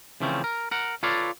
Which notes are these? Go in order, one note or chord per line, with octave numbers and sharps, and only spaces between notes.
C#3 E3 F3 A3 C4 C#4
A#4
A#4 F#5
F4 A4 B4 C#5 D5 F5